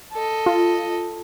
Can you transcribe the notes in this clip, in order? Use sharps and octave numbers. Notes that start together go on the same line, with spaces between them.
A4 D#5
F4